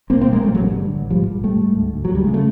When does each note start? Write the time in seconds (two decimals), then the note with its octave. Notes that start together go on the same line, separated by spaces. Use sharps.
0.10 B1 A#3 C4
0.21 A#3 C4
0.27 A#2
0.32 G#3 A#3
0.43 A1 G3 A3
0.54 F#3 G#3
0.61 G2
0.77 D3
0.93 A1
1.10 G#2 F3 G3
1.28 A#1
1.44 G#2 G3 A3
1.61 G#2
1.77 D2
1.94 D2
2.05 F#3
2.11 D2 G3
2.24 C#3 G#3
2.34 A3